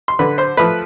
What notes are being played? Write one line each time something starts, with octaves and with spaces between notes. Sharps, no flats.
C6
D3 B4 B5
C5 C6
F3 A3 B4 B5